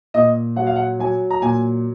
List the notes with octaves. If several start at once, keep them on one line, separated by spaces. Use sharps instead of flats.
A#2 D#5
F#3 F#5
F5
F#5
F#3 G#5
A#5
A#2 G#5